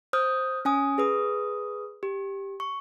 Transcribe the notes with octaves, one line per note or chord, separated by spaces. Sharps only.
C5 D#6 F6 G6
C#4 G#5 D#6
G#4 B4 D#6
G4
C#6